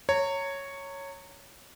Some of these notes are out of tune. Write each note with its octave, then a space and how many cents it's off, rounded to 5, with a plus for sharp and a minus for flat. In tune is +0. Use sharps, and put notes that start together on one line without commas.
C#5 +0 A#5 -30